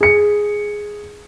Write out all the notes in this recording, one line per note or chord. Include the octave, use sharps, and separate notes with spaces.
G#4 C#7